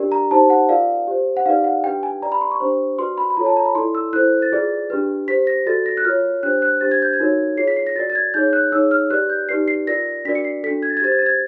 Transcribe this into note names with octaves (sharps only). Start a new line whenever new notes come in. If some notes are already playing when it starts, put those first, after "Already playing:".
Already playing: D4 G4 A#4 D5
A#5
D#4 G4 C5 A5
F#5
F4 A#4 D5 F5
G4 C5
F#5
D#4 G4 B4 D5 F5
F#5
D4 G4 B4 G5
G#5
G4 B4 D5 A#5
B5
C6
C#6
D4 G4 C5
F#4 B4 D5 C6
B5
B5
F4 A4 C#5 A#5
A5
A#5
B5
E4 A4 D5 C6
E6
E4 A4 C5 F#6
A6
F4 G#4 B4 D5
D4 G4 B4
G4 C5 B6
A#6
F#4 A4 D5 A6
A#6
F#6
F4 A#4 C#5 F6
D4 G4 C5 F#6
F#6
D4 G4 C5 A6
G#6
G6
G#6
D#4 F#4 A#4 C#5
F4 G#4 C#5 C7
B6
C7
A#6
F#4 A#4 D5 A6
A6
G#6
D#4 G#4 C#5 G6
F#6
D#4 G#4 C#5 E6
F6
G4 B4 D5 F#6
G6
D#4 G4 B4 D5 C7
C7
F4 A#4 D5 A#6
D4 F#4 A#4 D5 B6
C#7
C7
D4 F#4 A4 B6
G#6
A6
G#6
G4 C5 A6
G#6
A6
G#6